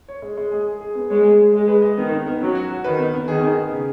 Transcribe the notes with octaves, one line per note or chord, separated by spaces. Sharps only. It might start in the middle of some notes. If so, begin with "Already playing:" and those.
C#5
G#3
G#3
G#4
G#4
G#4
B3
G#3 C#5
G#4
G#4
G#3 D#5
B4
D#5
D#3 B3
B3
B3
F#3 C#4
F#4
F#4
D#3 B4
B3
B3
D#3 G#4
B3
G#4
C#3